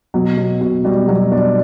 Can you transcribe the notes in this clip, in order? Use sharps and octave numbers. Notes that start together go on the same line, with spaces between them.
B2 F#3
B2
B2
B2 G3
B2 F#3
B2 D4